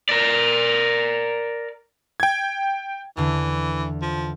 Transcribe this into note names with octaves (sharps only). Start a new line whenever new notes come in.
A#4 D5
G5 G#6
E2 D3 E3
F3